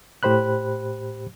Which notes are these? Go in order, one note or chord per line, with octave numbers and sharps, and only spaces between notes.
A2 G4 C5 B5 F#6